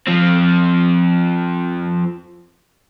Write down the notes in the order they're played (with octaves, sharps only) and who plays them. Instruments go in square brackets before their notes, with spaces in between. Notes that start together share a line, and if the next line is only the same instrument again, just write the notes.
[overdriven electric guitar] F3 C4